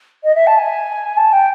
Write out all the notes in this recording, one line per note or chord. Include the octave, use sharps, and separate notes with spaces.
D#5
E5
A5
G#5
A5
G5